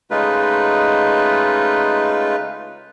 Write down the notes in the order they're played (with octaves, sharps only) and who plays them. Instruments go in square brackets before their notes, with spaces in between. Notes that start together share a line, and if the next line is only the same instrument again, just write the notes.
[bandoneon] C#3 G#3 A3 D#4 F4 B4